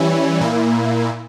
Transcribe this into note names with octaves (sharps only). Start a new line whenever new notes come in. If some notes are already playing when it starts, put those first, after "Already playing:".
Already playing: E3 G3 C#4 E4
A#2 A#3 E4